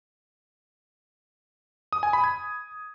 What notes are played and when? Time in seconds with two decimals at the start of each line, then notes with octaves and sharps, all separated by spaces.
1.93 D#6
2.03 G#5
2.13 B5
2.24 G#6